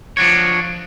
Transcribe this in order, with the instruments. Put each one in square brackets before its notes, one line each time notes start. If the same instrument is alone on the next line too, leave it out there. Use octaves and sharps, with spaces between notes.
[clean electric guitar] F3 D4 F#4 C#5